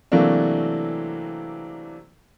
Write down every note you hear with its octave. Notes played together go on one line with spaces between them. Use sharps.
C3 E3 F#3 A3 A#3 D4